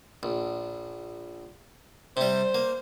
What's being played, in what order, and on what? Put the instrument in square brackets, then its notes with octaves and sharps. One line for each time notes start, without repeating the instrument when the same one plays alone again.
[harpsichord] A#1
[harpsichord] C3 G3 [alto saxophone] C5
[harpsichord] A#3